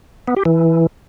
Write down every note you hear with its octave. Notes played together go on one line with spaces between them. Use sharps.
B3
G4
E3